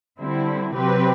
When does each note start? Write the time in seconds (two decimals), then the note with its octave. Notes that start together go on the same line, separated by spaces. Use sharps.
0.20 D3 G3 C4 E4
0.75 C3 F#3 C4 G4 B4